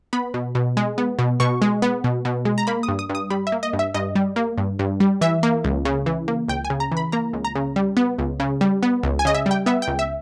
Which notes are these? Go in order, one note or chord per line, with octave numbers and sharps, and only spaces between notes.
B3 B5
B2
B2
G#3
B3
B2
B2 C#6
G#3
B3
B2
B2
G#3
A#5
A#3 B5
D#6
G2
D#6
G2
D#6
G3 B5
E5
A#3
D#5
G2
E5
G2 D#5
G3
A#3
G2
G2
G3
E3 E5
A#3
C#2
C#3
E3
A#3
C#2 G5
G#5
C#3
A#5
E3
B5
A#3 A#5
C#2
A#5
C#3
G3
B3
C#2
C#3
G3
B3
C#2
G#5
C#3 D#5
E5
G3 G5
B3 E5
G5
C#2
E5